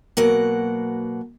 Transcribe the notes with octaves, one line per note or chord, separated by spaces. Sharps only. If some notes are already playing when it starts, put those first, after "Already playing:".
B2 F#3 A#3 F#5